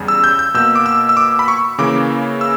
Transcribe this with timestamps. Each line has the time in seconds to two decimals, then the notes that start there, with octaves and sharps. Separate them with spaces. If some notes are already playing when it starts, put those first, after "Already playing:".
Already playing: E2 C#3 G3
0.08 E6
0.24 G6
0.39 G6
0.54 B2 A#3 E6
0.75 D6
0.86 E6
1.09 E6
1.17 D6
1.39 B5
1.48 C#6
1.78 C#3 E3 A#3 D6
2.41 E6